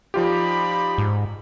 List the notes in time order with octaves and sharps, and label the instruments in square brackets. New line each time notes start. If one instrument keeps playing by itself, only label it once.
[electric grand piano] F3 F4 G4 [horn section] D#4 D5 B5
[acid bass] G#2